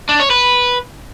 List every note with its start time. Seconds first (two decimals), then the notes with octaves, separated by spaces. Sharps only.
0.09 D4
0.20 C#5
0.30 B4